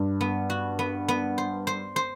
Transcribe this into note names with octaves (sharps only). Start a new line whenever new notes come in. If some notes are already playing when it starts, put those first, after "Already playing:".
Already playing: G2
B3
F#4
B3
B3
C5
C5
C5